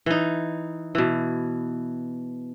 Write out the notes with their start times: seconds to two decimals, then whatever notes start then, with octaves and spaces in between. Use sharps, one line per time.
0.06 E3 D#4
0.95 B2 E3